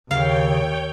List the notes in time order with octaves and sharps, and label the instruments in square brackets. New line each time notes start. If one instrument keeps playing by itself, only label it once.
[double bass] D#2 [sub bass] C#3 [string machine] C#5 G5 [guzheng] F5